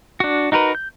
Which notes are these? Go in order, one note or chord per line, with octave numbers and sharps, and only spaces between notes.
D4 F#4
D#4 F#4 A#4 B4
G6